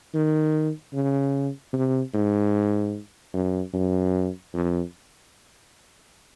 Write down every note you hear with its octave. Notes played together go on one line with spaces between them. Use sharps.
D#3
C#3
C3
G#2
F#2
F#2
F2